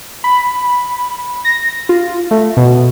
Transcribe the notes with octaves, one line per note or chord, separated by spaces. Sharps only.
B5
A#6
F4
A3
B2